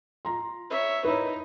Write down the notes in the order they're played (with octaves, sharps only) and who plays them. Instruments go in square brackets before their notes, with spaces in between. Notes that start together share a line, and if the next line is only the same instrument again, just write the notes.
[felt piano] F4 A#5 C6
[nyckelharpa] C#5 E5
[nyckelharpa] D#4 E4 [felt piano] B4 C#5